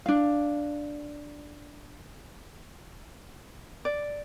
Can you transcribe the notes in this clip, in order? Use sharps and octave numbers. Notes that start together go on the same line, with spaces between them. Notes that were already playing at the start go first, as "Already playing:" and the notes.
D4 F5
D5